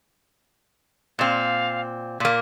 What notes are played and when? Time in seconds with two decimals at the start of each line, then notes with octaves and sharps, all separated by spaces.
1.19 A#2 C4 F5
2.20 A#2 A#3 B6